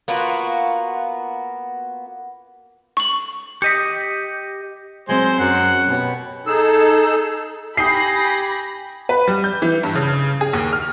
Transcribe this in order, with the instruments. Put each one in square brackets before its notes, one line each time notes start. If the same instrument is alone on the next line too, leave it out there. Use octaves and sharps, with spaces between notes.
[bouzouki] A#3 B3 F4 F#4
[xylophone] C#6 F#7
[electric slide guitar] G4 D#5 [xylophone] B6 C#7
[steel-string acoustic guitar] F#3 C4 [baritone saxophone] G#3 [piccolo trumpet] C5
[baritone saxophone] F#2 [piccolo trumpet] F#5
[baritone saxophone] B2 [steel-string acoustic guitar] G4 C#5
[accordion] D#4 G#4 E6 [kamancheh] A4
[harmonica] G4 [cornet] G#5 [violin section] B5 A#6 [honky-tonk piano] D#6 G6 C7
[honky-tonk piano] B4
G3
G6
E3
G2
C#3
G#4
D#2
F6